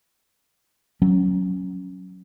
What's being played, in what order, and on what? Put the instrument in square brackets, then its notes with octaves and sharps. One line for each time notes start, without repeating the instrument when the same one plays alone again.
[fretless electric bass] F#3 C#4